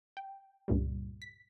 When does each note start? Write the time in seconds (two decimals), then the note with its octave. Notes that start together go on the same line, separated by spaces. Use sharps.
0.17 G5
0.68 C#2 G2 A#2 G3
1.22 B6